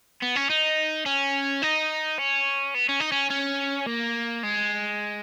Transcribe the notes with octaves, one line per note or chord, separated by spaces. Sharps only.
B3
C#4
D#4
C#4
D#4
C#4
B3
C#4
D#4
C#4
C#4
A#3
G#3